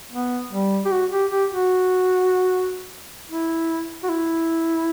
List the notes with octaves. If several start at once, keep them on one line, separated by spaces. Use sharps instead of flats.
B3
G3
G4
F#4
G4
G4
F#4
E4
F#4
E4